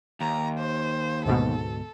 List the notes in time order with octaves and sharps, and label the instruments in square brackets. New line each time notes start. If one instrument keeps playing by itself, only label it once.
[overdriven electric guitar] D#2 [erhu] A#5
[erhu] C5
[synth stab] D2 G#2 B2 [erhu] A4